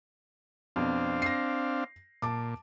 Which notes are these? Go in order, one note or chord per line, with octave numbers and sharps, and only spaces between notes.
F2 B2 C4 D4 F5
A#6 C7
A#2 A5 D6